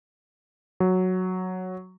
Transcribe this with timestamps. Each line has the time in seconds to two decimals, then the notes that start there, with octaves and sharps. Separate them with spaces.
0.80 F#3